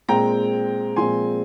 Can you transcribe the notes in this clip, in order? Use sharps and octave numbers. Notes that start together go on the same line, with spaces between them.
A#2 G#3 C4 G5 A#5
A#2 F3 G#3 C4 G#5 C6